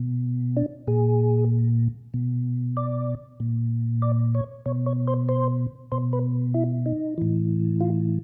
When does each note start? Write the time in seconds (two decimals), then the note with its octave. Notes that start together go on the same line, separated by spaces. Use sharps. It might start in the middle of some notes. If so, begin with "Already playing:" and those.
Already playing: B2
0.57 D4
0.87 A#2 G#4
2.14 B2
2.77 D5
3.40 A#2
4.02 D5
4.35 C#5
4.66 B2 C#5
4.86 C#5
5.08 C5
5.29 C5
5.92 B2 C5
6.13 B4
6.54 E4
6.86 D#4
7.18 A2 E3
7.81 F4